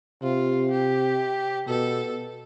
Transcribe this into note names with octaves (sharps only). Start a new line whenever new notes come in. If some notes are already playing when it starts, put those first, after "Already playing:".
C3 F4
G4
B2 A4